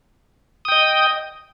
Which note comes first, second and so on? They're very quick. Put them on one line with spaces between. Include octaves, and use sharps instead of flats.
D#6 G5 D#5